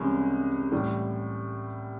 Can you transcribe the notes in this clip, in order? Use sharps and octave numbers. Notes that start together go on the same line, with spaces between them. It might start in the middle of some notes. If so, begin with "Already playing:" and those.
Already playing: C2 C3 E3 G#3 C#4
A2 E3 G3